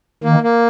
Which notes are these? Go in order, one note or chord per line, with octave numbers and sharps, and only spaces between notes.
D#3 A#3
A#3